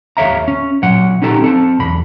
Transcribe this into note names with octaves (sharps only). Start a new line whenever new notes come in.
D#2 A4 C#5 E5 F5 A#5
C#4
A#2 F#3 F#5
C#4 D#4 G4 A4 A#5
C4 A4 A5
B1 E2 B5